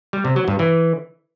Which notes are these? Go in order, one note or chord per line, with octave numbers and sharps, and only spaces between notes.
G3
C3
F#3
G2
E3